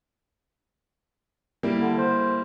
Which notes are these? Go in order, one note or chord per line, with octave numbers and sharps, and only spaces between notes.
G3 A#3 E4
D3
C5